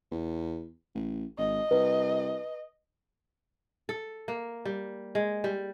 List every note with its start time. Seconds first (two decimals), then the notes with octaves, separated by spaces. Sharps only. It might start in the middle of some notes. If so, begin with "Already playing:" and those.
0.11 E2
0.95 A1
1.38 G#1 D#5
1.71 C2 B4
3.89 A4
4.28 A#3
4.65 G3
5.15 G#3
5.44 G3